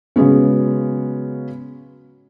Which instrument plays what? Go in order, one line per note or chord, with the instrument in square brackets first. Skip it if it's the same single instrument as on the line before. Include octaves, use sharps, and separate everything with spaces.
[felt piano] C#3 F#3 G#3 B3 C#4